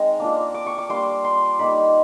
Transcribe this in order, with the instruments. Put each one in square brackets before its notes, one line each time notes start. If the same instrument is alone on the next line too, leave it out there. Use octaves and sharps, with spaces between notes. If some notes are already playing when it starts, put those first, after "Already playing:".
Already playing: [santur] G#3 C4 D#4 A#5
A#3 D4 F4
D6
C#6
D6
G3 A#3 D4 C6
C6
G3 A#3 D#4 B5